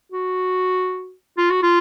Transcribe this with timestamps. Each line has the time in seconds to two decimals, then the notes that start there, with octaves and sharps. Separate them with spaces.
0.12 F#4
1.38 F4
1.50 F#4
1.63 F4